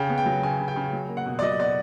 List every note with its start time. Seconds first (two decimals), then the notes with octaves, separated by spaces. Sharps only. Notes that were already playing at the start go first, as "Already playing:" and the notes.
Already playing: C#3 G5
0.09 B3
0.18 G5
0.26 F#3
0.43 C#3 G#5
0.60 C#3
0.68 G5
0.76 C#3
0.93 F#3
1.09 A#3
1.17 F#5
1.26 B2
1.39 D5
1.42 F#3 D#5
1.59 B2 D5